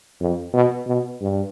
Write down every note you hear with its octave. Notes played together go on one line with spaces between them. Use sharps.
F2
B2
B2
G2